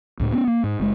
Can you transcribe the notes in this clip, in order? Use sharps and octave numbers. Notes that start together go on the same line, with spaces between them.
C#2 A2
B3 C#4
A#3
G#2
F#1 G#3